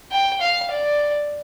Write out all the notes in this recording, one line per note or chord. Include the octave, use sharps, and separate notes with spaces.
G5
F5
D5